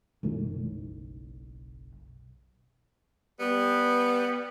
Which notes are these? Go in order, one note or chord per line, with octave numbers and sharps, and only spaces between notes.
F#1 B1
G3 B3